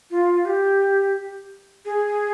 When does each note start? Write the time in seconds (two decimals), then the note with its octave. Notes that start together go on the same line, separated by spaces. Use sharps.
0.11 F4
0.45 G4
1.85 G#4